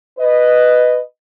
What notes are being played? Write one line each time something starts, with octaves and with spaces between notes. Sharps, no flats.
B4 D#5